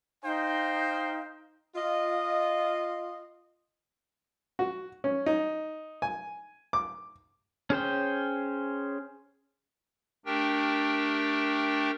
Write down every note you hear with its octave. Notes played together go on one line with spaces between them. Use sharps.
D#4 C5 F5 G5
F4 D#5
F#4
C#4
D#4
G#5
D6
C#4 G#4 C5 G5
A3 D4 G4 A#4 G5